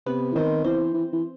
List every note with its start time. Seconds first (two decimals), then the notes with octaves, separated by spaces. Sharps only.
0.06 C3 B3 B4
0.32 E3
0.35 D#3 C4 C5
0.64 E3 C4 C5
0.94 E3
1.13 E3